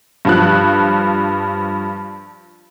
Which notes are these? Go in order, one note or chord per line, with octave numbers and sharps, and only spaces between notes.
G2 F3 F#6